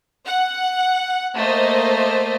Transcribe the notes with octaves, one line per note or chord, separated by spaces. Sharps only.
F#5
A3 A#3 C5 D#5